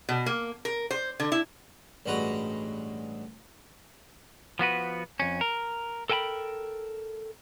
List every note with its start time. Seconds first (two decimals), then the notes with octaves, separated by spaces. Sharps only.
0.09 B2
0.26 A#3
0.65 A#4
0.91 C5
1.20 D3
1.32 E4
2.06 A1 G2 G#3 F#4 B4 A#5
4.59 F3 B3 F#4 B4
5.20 F2 C#4
5.41 A#4
6.10 A4 A#4 G5 G#5 B5